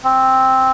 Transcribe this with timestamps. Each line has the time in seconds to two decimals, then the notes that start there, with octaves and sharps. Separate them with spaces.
0.04 C4